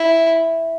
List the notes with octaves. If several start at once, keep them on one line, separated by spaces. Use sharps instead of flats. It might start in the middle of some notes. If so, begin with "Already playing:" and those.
Already playing: E4